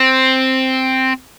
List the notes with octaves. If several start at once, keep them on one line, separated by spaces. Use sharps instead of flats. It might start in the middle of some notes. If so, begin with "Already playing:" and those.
Already playing: C4